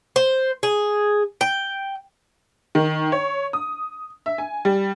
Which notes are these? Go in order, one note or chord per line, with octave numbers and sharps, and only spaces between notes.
C5
G#4
G5
D#3
C#5
D#6
E5
G#5
G3